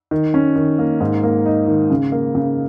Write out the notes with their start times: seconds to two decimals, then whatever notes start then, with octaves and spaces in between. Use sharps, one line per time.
0.11 D#3
0.34 C#4
0.56 D#3
0.79 A#3
1.00 G#2
1.23 A#3
1.46 D#4
1.68 D#3
1.90 C#3
2.12 A#3
2.35 C#3